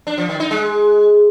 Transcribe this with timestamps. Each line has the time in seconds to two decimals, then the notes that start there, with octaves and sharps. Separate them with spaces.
0.07 D4
0.18 F3
0.29 D#3
0.40 D#4
0.51 G#3